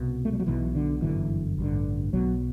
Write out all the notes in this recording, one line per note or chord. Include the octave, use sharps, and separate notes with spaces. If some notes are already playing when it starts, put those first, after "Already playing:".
Already playing: C2 B2
A3
G3
F#3
B1 B2 E3
D3
G1 F#2 D3 E3
A1 G2 D3
B1 B2 F#3